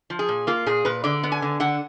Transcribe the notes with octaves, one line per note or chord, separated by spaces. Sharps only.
F3
G#4
A#2
A#3 F4
A#2 G#4
A#2 B4
D3 D5
B3
G#5
D3
D3 F#5